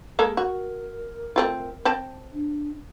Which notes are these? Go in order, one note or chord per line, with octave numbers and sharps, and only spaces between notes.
G#3 A#3 G#4 A4
F#4 A#4
A3 C4 F4
C4 G5 A5
D4